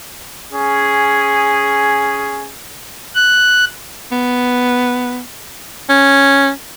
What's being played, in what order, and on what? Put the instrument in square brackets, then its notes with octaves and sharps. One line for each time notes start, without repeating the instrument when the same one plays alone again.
[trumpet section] C#4 G#4
[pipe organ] F#6
[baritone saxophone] B3
C#4